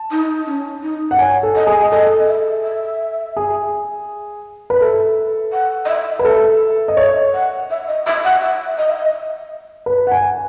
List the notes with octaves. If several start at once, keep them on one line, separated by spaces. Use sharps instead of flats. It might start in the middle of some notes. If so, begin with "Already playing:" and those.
Already playing: A5
D#4
C#4
D#4
F#5
C#5 G#5
A4
D#5
G#4
A4 D#5
E5
E5
G#4
B4
A4 E5
F#5
D#5
E5
B4
A4 E5
D#5
C#5 E5
F#5
E5
D#5
E5
F#5
E5
D#5
E5
D#5
B4
F#5
G#5